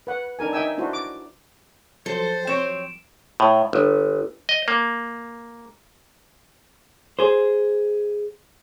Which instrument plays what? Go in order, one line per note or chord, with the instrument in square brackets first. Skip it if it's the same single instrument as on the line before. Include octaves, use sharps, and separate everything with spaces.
[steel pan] B4 F#5
D4 D#4 A#4 G#5
D#4 D#5 E5 G5 G#5 E6
D4 E4 F#4 C5
D6
[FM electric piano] F3 F#3 [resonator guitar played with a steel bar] A4 [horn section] C5
[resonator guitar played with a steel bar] C4 C#5 [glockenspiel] D7 E7
[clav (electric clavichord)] A2
G1
D#5
A#3
[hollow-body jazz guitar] G#4 C5